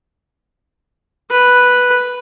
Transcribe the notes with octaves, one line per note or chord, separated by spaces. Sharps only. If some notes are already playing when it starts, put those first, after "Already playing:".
B4